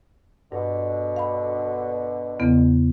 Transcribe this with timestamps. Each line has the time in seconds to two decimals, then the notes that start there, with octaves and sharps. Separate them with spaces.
0.52 G2 B2 D3
1.16 F5 B5
2.39 E2 C#3 B3